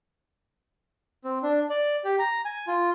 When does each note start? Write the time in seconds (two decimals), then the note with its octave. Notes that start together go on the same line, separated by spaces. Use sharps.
1.24 C4
1.43 D4
1.70 D5
2.04 G4
2.19 A#5
2.45 G#5
2.67 F4